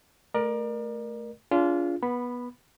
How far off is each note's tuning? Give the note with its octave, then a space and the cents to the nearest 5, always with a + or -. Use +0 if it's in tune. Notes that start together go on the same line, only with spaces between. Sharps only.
A3 +0 A#4 +20 D5 +35
D4 -40 F4 -15 G#4 +0
B3 -15 B5 +0